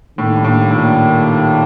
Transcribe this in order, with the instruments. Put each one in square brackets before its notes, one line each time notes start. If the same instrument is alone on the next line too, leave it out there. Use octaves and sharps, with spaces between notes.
[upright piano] A2 [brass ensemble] D#3 G3 A#3 D4
[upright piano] A2
A#2